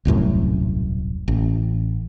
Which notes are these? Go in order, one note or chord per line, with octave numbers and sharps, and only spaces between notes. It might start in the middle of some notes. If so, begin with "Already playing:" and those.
D#1 C2 F#2 A2
A1